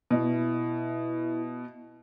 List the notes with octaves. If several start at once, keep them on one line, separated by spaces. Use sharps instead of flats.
B2 E4